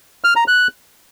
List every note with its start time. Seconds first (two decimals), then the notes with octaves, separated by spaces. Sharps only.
0.24 F6
0.36 A#5
0.48 F#6